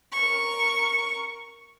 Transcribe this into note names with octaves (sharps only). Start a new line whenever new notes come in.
A#4 C#6